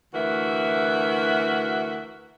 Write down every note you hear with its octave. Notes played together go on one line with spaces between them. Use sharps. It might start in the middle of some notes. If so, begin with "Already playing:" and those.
D2 E3 F#4 A#4 E5